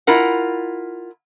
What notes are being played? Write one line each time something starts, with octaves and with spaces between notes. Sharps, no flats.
E4 F4 A#4 F#5